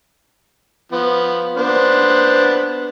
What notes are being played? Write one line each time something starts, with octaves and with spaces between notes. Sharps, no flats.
F3 B3
B3 D4 C5